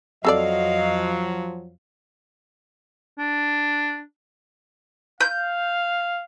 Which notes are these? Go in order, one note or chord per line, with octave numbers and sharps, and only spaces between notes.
F2 F3 F#3 C4 A4 D5 D#5 F5
D4
F5 G6